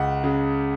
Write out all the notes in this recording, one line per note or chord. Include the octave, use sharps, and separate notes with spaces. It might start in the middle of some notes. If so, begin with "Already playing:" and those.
Already playing: C#2 F#5
C#3